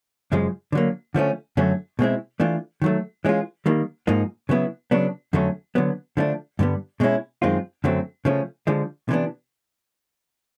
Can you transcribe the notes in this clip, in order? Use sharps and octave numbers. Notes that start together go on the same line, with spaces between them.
F#2 C#3 F3 G#3
D3 F#3 A#3
D3 F3 A3 C#4
F#2 D3 F#3 A3 C#4
B2 G#3 C4 E4
E3 A3 D4 F4
D#3 F#3 A3
E3 G#3 C#4 F4
D#3 G3 A#3
G#2 F3 A#3 D#4
C#3 F#3 B3 E4
C#3 F#3 B3 D4
F2 D3 F#3 A3 C#4
D3 F#3 B3
D3 F3 A3 D4
G2 D3 G3 B3
B2 G#3 C#4 E4
F#2 D#3 G#3 C4 F4
F#2 D3 F#3 A3 C4
C#3 F3 A3 C#4
D3 F3 G#3
C3 E3 G3 B3 D4